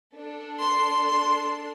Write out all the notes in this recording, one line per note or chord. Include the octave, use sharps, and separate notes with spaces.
D4 A4
C6
C6